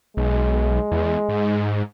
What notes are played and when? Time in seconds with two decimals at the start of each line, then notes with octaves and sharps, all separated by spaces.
0.17 B1 G#3
0.91 E2
1.29 G#2